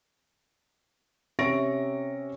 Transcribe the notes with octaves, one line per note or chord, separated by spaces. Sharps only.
C3 C#4 E5 C#6 A#6 D7